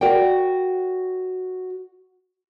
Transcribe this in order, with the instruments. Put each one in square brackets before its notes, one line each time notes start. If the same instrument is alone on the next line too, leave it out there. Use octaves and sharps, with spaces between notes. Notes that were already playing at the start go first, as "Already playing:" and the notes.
[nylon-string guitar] F#4 A#4 D5 F#5 G5